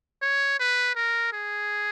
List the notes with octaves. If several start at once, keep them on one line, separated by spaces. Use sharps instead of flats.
C#5
B4
A#4
G#4